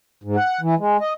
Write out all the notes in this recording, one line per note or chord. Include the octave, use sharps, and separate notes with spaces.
G#2
F#5
E3
G#3
D#5